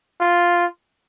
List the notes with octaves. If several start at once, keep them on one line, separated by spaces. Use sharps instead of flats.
F4